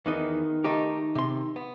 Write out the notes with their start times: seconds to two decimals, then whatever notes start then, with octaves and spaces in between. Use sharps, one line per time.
0.06 E2 D#3 B3 D#5
0.64 A3 D#4 G4
1.15 C3 C6
1.56 B3